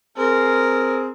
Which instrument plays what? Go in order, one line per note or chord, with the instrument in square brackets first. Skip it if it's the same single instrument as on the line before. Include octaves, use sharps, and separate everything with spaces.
[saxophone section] C4 G#4 [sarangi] A#4